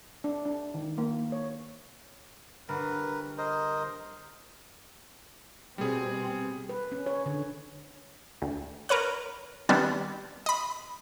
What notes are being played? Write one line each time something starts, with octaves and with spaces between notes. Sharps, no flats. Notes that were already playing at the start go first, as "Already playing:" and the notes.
D4
D4
D#3
A#3
C#5
G1 A#4 B4
A#4 C5 D#5
B2 G3 C4 G#4
B4
C#4
C#5
D3
D2
A#4 B4 C#5 F#5
D#3 G3 B3 C4 D4
D#5 B5